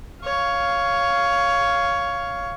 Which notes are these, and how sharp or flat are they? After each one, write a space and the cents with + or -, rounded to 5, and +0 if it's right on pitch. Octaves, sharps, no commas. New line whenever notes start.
C#5 +10 F5 +0